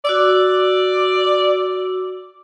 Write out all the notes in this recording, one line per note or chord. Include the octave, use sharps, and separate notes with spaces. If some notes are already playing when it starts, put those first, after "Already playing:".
F#4 D5 D6 E6